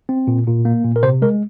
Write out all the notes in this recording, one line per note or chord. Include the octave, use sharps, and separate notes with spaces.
C4
A#2
A#2
A#3
A#2
A#4
C3 C5
G#3 A#4